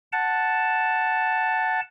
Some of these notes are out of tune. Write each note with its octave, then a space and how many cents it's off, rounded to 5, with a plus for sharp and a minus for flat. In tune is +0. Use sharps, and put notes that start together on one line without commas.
F#5 +0 A5 +0